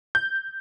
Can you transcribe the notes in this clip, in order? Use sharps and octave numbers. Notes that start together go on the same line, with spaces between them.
G6